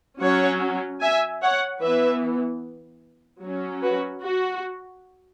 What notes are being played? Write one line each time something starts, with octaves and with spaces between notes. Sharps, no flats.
F#3 C#4 C#5 F#5
E5 G#5
C#5 F#5
E3 B3 B4 E5
F#3 C#4
F#4 B4
F#4